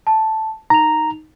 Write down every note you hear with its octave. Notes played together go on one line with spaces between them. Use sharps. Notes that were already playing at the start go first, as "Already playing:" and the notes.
A5
D#4 A#5 F7